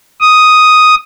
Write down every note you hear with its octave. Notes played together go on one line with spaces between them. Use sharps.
D#6